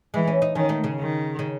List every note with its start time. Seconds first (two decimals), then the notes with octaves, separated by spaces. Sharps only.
0.14 E3 G#3
0.27 C#4
0.42 D#4
0.55 D#3 C#4
0.69 A3
0.84 C#3
0.98 D#3
1.39 C#3